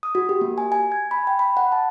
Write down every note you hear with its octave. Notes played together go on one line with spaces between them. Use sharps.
D#6
F#4
G4
A#3
G#5
G#5
G#6
B5
G5
B5
F#5
A5